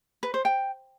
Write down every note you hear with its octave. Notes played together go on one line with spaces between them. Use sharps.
B4
C5
G5